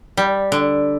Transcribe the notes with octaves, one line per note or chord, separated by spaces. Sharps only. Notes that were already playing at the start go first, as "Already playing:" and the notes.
G3
D3